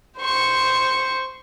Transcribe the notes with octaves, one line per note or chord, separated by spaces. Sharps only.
C5 C#6